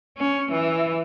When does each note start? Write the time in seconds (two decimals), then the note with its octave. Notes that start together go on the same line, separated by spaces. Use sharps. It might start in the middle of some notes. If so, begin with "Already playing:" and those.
0.18 C#4
0.53 E3